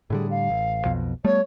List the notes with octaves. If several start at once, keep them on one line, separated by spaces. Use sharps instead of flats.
A2 D3 G3 G#4
F5
A1
B1 F2 B2
G3 A3 B3 C#5